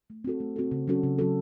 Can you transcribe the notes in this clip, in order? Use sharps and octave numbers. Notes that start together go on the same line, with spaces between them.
A3
C4 F#4 A4
A3
C4 F#4 A4
C#3
F#3 C#4 F#4 A4
C#3
F#3 C#4 F#4 A4